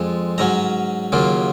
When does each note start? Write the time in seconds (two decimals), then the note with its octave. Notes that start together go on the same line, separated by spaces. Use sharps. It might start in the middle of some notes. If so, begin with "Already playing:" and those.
Already playing: F2 F3 G#3
0.38 G#2 F#3 C#4 A#5
1.12 D#2 C#3 F#3 A#3 F4